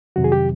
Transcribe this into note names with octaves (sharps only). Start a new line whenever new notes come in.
F2 C3 D#3 F#3 F#4
G#4
G4